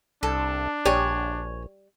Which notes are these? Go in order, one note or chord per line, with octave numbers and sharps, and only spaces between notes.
C2 D4 A4
A#1 G3 G4 C#5 D5 G#5